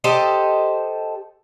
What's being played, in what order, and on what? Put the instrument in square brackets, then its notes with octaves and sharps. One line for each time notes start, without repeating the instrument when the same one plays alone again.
[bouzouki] G4 A4 C5 D#5